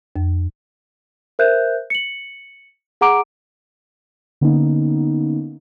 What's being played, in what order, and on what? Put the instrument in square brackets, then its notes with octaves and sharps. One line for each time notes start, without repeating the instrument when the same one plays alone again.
[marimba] F2
[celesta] A#4 C5 E5 F#6 G6
C#7 F#7
G#4 F#5 A#5 D6 D7
[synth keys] D3 A#3 B3 C#4 D#4